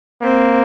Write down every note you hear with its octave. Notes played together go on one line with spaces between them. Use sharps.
A#3 C4